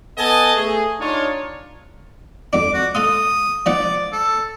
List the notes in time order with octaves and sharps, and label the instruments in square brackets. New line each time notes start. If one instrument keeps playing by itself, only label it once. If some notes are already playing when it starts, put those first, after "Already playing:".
[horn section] B3 A4 D#5 G#5 A5
A3 G#4
D4 D#4 F4 C#5
[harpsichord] F2 D4 [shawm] D6
[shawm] F#4
[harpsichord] A4 F5 C6 [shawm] D#6
[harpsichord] F3 D4 F#5 [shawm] D5
[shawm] A4